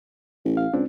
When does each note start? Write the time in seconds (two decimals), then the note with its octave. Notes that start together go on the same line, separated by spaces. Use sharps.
0.45 A1
0.57 F5
0.73 C#2 C4 D4